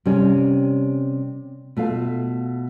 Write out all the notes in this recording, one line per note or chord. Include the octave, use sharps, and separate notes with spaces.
C3 G3 C#4
B2 A3 F4 F5